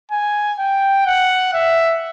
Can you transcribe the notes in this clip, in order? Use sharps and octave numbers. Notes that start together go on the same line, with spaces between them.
G#5
G5
F#5
E5